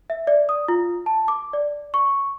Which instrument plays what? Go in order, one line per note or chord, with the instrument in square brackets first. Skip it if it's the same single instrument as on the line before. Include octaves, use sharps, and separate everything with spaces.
[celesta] E5
D5
D#6
F4
A5
D6
D5
C#6